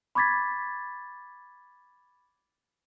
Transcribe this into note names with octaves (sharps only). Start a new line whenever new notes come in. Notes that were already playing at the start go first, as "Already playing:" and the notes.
B5 C#6 D6 G#6 A6 B6